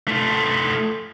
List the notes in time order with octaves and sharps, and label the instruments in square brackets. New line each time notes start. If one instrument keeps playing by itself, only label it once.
[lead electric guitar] A3 F4